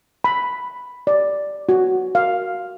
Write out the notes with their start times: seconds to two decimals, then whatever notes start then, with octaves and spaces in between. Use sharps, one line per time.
0.24 B5
1.07 D5
1.69 F#4
2.15 F5